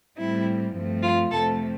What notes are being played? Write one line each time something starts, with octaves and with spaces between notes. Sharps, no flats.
A2 G3 C4 E4
G2 F3 A3 C4
F4
F2 C3 F3 A3 C4 A4